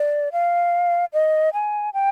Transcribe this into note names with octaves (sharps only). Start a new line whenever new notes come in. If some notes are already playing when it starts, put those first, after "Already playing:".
Already playing: D5
F5
D#5
G#5
G5